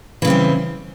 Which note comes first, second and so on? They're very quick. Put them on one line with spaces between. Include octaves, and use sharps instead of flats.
E3 C#3 C4 G3